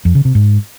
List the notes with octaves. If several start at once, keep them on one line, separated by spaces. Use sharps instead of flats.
F2
C#3
C3
G#2